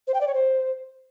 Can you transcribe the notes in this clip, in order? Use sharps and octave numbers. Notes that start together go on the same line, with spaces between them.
C5
G5
D5
C#5
C5